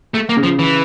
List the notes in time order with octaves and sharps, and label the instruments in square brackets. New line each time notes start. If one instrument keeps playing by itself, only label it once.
[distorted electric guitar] A3
A#3
[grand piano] C#3
[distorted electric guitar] F3
E3